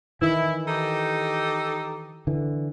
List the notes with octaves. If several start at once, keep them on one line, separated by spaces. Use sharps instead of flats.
D#3 E3 E4
D#4 G4 A4
D3 E3